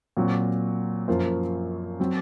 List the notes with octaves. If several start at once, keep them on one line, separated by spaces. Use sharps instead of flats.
A#2 F#3 C4 F#4
F#2 F3 A#3 F4 C5
F#3 C4